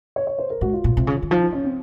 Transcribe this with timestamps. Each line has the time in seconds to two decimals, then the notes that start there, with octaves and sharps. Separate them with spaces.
0.16 C#5
0.27 C#5
0.38 C5
0.50 A#4
0.61 G#2 F#4
0.73 F4
0.84 A#2
0.97 C3
1.07 C#3
1.22 D#3
1.30 F3 D#4
1.42 D#4
1.53 C#4
1.64 C4